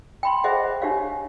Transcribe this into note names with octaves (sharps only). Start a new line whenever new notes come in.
G5 B5 C6
G#4 C5 D#5 E5 F#5
D4 G4 C#5 F5